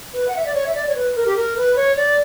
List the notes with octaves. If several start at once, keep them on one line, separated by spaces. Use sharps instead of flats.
B4
F#5
E5
D5
C#5
E5
D5
C#5
B4
A#4
G4
A#4
B4
C#5
D5